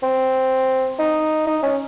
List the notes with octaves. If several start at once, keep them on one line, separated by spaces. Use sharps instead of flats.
C4
D#4
D#4
C#4